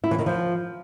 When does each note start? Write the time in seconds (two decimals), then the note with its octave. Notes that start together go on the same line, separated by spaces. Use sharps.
0.04 E4
0.11 E3
0.19 D#3
0.26 F3